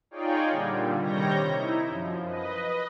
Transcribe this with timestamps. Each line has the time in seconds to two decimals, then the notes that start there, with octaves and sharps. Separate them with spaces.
0.11 D#4 F4 G#4 C#5 D5 G5
0.50 A#2 D3 G3
1.00 C3 D#3 G3 C#5 G6 A#6
1.50 D#4 E4
1.86 F#2 F3
2.25 B4 D#5